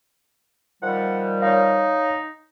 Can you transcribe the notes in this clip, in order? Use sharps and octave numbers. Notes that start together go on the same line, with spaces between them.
D#3 F3 G3 F#5
D#4 C#5 F5